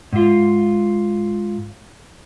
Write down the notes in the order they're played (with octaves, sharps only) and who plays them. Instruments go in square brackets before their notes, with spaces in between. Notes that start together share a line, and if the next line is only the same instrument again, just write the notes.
[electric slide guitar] G#2 F4